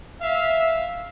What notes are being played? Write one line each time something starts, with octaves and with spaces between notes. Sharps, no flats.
E5 F5